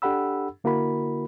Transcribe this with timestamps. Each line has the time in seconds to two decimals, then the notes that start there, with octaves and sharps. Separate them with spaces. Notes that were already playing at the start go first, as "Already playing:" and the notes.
0.02 D4 G4 A4 F#5 B5 E6
0.64 D3 A#3 E4 F#4 A#4 B5